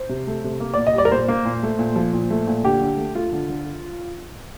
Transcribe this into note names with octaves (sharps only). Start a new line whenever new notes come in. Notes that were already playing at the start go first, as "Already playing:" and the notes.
Already playing: C5
C3
A3
C3
A#3
A#2 D5
D#5
G3 D5
A#4
A#2 C5
A#3
A#2
A3
A#2
F3
A#2
A3
A#2
D3 G4
D3
A3
A3 F4
D3
D3